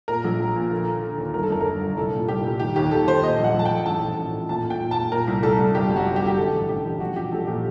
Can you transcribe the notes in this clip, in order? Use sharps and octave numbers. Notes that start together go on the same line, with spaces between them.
A#2 A#4
A#1
A#1
A#2
D3
D3
D3
D#2
G1 A#4
A4
F#2 A#4
A#4
D3 A4
G1
C2 A4
A#2
C2 G4
A#2
D#3 G4
D#2 G4
D#2 A4
D#2 C5
A#2 D#5
A#1 F#5
A#1
A5
G5
A#1
A1 A5
A2
A1
A2
A#2 A5
A#2
G5
A#2
A#2 A5
A#2 A#4
C2
C2 A4
C2
G1 G4
F#2
F#4
F#2
G4
G1
G4
D3 A4
A1
A1 G4
A1
A#1 F#4
A#1 G4
A#1 A4
A#2 G4